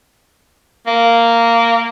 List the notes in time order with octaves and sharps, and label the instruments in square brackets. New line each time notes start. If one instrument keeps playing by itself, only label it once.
[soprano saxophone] A#3